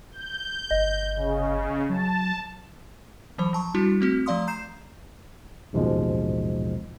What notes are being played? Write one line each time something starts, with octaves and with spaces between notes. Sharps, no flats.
G6
G1 D#5
C#3
F#3 A5
E3 F#3 C5
F3 A5 C#6
G3 D4 E4 F#4
A3 C4 F#4
F3 A3 D5 F5 C6 D#6
A#5 G6 C7 E7
A1 D#2 G#2 B2 F3 G#3